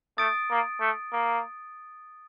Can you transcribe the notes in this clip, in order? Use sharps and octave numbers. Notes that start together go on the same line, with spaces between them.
A3 D#6 A6 D7
A#3
A3
A#3